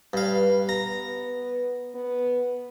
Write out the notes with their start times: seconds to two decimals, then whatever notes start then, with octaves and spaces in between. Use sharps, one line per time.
0.13 G2 B4 F5
0.69 B3 A#5
1.95 B3